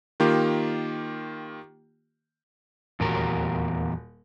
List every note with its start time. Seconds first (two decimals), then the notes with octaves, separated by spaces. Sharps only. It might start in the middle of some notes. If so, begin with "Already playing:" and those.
0.20 D#3 A#3 F4 G4
3.00 D#1 E2 F#3 G4 A#4